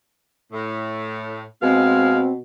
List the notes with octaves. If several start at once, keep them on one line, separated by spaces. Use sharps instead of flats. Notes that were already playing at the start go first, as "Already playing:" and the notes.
A2
B2 G#3 C4 F5